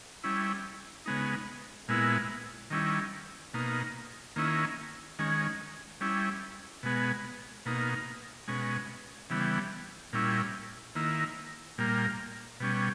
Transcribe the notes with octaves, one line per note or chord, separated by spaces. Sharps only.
G3 C#4 E4
C#3 G#3 B3 D#4
A#2 G#3 B3 E4
D#3 G3 C#4 E4
B2 A#3 D#4
D#3 A#3 C#4 E4
D#3 G#3 C#4
G3 C#4 E4
B2 G#3 B3
B2 A#3 D#4
B2 G#3 C#4
C#3 E3 G3 B3
A#2 G3 C#4 E4
D#3 A#3 E4
A#2 G3 A#3
B2 G3 C#4